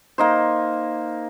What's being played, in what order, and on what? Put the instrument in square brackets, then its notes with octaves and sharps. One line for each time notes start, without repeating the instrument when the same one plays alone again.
[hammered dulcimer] A#3 D#4 C5